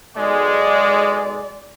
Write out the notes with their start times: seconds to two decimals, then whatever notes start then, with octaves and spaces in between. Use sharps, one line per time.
0.17 B1 G#3 D5